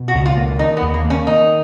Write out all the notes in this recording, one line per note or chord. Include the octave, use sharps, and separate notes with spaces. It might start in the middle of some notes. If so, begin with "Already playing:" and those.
Already playing: B2
F#4
C#2
F4
A#3
D#3 D#4
B3
D#2
A#3
A#3
C#4
D#3 D#4